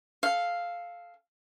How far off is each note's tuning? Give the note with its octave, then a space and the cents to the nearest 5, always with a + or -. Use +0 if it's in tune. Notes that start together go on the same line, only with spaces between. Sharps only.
A4 -15 F5 +0